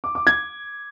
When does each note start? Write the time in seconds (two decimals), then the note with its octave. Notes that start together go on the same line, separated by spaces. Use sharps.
0.04 D6
0.15 D6
0.27 G#6